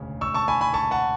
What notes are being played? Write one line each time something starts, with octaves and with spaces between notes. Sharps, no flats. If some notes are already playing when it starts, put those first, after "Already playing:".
Already playing: E1 D2 C#3
C#6 E6
A5 C#6
G#5 B5
G#5 B5
A5 C#6
F#5 A5